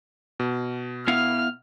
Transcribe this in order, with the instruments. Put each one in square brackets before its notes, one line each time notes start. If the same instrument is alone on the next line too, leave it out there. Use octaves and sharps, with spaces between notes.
[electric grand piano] B2
[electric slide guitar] B3 E4 F5 [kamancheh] F6